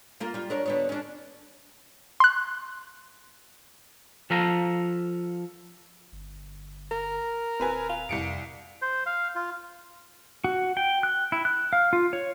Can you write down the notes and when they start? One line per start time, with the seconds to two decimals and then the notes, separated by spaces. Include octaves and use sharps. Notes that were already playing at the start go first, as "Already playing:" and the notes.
0.20 A#3 F4 A#4
0.34 G3 F4
0.50 D4 A#4 C#5
0.66 D3 B3 C#5
0.89 C#4 D4
2.20 C6 F#6
4.30 F3 A4 F5 A#5
6.12 G1
6.91 A#4
7.60 D#1 C4 B4 G#5
7.89 F5
8.09 C2 F2 C#7 D7
8.82 C5
9.06 F5
9.35 F4
10.44 F#4
10.77 G5
11.03 F#6
11.32 E4
11.45 F#6
11.73 F5
11.93 F4
12.13 C#5